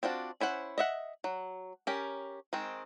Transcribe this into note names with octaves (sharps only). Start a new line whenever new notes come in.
C4 D4 F4 F#4
C#4 E4 C5 F#5
D#5 E5 F#5
F#3
C#4 G4 A#4
D#3 G#3 C4